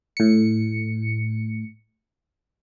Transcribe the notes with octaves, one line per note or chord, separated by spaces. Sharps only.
A2 C#7